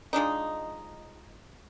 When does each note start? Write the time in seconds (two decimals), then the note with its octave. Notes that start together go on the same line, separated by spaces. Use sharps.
0.13 F3 G#3 D4 D#4